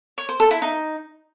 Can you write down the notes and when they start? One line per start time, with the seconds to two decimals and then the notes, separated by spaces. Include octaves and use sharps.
0.18 C#5
0.29 C5
0.40 A4
0.51 E4
0.62 D#4